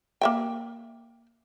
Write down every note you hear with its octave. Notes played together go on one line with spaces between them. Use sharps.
A#3 E5 G5